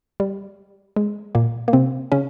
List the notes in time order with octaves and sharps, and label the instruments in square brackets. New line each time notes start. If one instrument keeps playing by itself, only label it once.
[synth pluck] G3
G#3
A#2 A#3
A#3
C3 C4
C#3 C#4